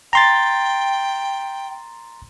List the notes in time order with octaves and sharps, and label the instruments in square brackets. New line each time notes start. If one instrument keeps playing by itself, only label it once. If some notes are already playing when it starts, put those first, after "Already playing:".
[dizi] G5 [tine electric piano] A#5 C6 A6